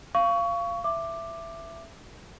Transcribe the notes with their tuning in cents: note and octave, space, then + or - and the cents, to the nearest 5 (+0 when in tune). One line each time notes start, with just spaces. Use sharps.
F5 -20 C#6 +20
E5 +15 D6 +10